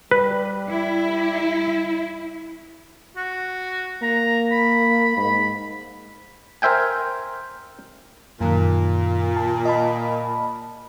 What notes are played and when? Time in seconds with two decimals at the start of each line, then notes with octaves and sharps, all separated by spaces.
0.11 G3 B4
0.69 E4
3.16 F#4
4.02 A#3 A#5
4.52 B5
5.17 G#2 B5
6.62 A#4 C5 E5 G5 G#5
8.41 F#2 A#2 D#3
9.37 A5
9.65 D#5 A5 B5